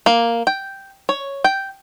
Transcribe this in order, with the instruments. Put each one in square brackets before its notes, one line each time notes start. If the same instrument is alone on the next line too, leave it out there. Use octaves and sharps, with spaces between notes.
[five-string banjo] A#3
G5
C#5
G5